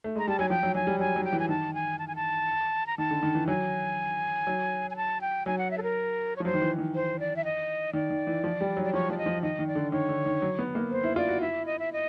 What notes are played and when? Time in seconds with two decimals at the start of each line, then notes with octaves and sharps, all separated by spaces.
0.04 A3
0.16 G#3 A#5
0.27 G3 A5
0.39 F#3 G#5
0.50 F3 G5
0.63 F#3
0.75 F#3 G#5
0.87 G3
1.00 F#3 G#5
1.16 F#3
1.24 G5
1.33 E3
1.39 G#5
1.49 D#3 A5
1.74 G#5
1.99 A5
2.08 G#5
2.16 A5
2.87 A#5
2.98 D#3 A5
3.11 D3
3.23 D#3
3.35 E3
3.48 F#3 G#5
4.47 F#3
4.91 G#5
4.97 A5
5.21 G5
5.46 F#3 G#5
5.58 F#5
5.71 E5
5.78 A4
5.83 A#4
6.36 C#5
6.40 F3
6.45 F#3 C5
6.54 D#3
6.62 E3
6.78 D#3
6.95 C5
7.19 D5
7.36 E5
7.45 D#5
7.93 D#3 D5
8.10 D#3
8.27 E3
8.44 F3
8.61 G3
8.77 F#3
8.84 D5
8.93 F3 C#5
9.10 F3 D5
9.18 D#5
9.26 F3
9.43 D#3 D#5
9.59 D#3
9.67 D5
9.75 D3
9.92 D#3 C#5
10.09 D3
10.26 D#3
10.42 F#3
10.59 B3
10.75 A#3
10.91 C5
11.04 E4
11.16 F4 D5
11.29 F#4
11.41 E4 E5
11.66 D#5
11.79 E5
11.93 D#5